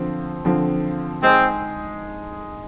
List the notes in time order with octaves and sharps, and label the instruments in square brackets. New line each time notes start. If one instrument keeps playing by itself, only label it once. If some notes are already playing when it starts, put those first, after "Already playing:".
Already playing: [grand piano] D3 F3 C4
D3 F3 C4
[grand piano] G#3 D#4 G#4 [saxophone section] C4